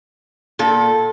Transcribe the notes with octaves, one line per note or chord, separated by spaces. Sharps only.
A#2 A4